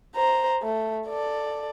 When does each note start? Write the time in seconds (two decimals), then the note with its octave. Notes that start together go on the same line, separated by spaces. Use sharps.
0.16 C5 A#5
0.62 A3
1.08 A4 D5